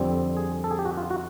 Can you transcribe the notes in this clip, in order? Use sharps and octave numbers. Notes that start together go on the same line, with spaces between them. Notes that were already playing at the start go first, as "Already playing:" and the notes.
Already playing: F2 D3 G3 C4
G#4
A4
G#4
G4
F#4
F4
F#4